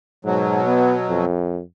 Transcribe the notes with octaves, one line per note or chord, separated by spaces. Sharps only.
G#2 B2 F#3
B3
F2